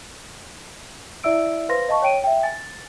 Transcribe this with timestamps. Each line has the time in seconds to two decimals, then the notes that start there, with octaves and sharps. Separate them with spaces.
1.24 E4 D5 E5 E6 D7
1.69 B4 C5 F5 C6 A#6
1.89 D#5 F5 A5 C#6
2.02 C#5 G5 D7 D#7
2.24 E5 G5
2.43 G#5 A6